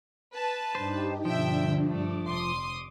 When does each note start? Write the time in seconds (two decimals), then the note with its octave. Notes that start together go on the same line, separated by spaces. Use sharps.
0.35 B4 A5
0.75 G2 D4 D#4 G4 C5
1.25 G2 B2 D3 F3 D4 E5 G5
1.88 G2 A3 D6
2.28 F1 C6 D#6